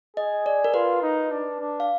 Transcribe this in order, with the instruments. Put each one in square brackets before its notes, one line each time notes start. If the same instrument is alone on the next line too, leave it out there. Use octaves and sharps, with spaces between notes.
[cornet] G#4 [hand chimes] D#5
[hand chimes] D5
A#4
[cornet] F4 [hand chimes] B4
[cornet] D#4
D4
D4
[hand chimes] F5